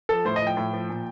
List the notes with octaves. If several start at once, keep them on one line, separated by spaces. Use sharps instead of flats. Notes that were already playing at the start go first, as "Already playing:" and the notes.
F3 A4
A2 C5
D#5
F3
G5
A2
F3
A#2